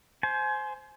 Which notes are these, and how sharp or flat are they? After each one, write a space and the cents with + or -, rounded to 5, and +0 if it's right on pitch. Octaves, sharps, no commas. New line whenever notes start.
C5 +0 G#5 +30